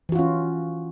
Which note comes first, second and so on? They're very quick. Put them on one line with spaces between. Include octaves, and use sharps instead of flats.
E3 F#4 F4 C#4